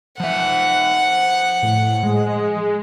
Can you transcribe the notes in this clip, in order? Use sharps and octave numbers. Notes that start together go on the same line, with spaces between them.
F3 E5 F#5
A2
G#3